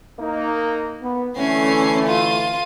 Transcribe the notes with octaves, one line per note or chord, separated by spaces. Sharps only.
A#3 D#4
B3
D3 E3 A3 C#4 C7
F4 D#7